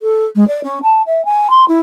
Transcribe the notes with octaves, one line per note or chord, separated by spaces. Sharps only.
A4
G#3
D5
C#4
A5
E5
G#5
C6
E4